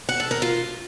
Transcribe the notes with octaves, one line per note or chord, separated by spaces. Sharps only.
F#5
A4
A#4
F4